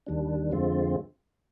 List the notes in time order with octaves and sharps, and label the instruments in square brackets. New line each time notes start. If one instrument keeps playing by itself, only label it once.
[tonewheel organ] D#2 D#3 G3 D4
F2 D3 G#3 C4 F4